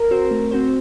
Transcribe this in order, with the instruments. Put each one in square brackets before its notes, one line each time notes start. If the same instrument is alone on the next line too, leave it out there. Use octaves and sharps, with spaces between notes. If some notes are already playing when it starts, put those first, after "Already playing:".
Already playing: [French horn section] A#4
[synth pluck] C4 F#4 C5
A3
C4 F#4 C5